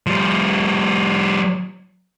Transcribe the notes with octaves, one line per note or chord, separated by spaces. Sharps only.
F3 G3